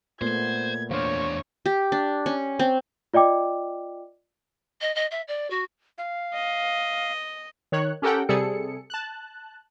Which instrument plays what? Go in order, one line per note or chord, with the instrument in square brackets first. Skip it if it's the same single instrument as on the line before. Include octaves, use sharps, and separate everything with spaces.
[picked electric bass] A#2 [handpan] A3 B3 [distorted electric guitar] C5 [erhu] G#6
[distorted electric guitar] E2 D4 [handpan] C5 F5 [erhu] C#5
[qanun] G4
D4
C#4
C4
[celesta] F4 D5 D#5 G5 D6
[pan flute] D#5
D#5
E5
D5
F#4
[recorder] F5
[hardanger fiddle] D#5
[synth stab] D#3 C#5 F#6
C#4 G4 A4 A#4 F#5 G5
C3 G3 G#4 A4 C#7
A5 F#6